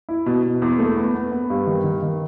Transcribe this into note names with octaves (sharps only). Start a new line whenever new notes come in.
E4
B2
B2
E2
A3
B3
B3
B3
G2
D#3
D#3
D#3